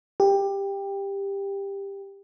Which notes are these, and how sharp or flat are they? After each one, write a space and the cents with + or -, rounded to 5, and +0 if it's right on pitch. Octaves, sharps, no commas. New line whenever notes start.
G4 +15